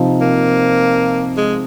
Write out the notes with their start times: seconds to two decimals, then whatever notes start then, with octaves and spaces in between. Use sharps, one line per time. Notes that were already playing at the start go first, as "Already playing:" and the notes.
Already playing: C3 F3 C4 D#4
0.21 A#3
1.37 G#3